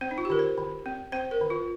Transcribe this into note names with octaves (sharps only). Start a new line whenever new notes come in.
C4 C5
D#4
F4
G4
D#3 A#4
C5
D#3
C4
C4 C5
A#4
D#3
F4